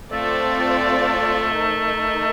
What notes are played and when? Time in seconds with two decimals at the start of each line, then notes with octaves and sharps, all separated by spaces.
0.11 A3 C4 F4 A4 D5
1.55 D#4 A#4 D#5